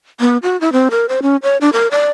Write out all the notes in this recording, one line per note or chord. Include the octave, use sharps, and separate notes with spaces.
B3
F#4
E4
C4
A#4
C5
C#4
C#5
D4
A#4
D5